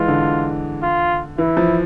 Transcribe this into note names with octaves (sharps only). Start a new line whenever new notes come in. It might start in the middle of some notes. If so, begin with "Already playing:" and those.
Already playing: E3 G#3 F4
D3
F4
E3 E4
F3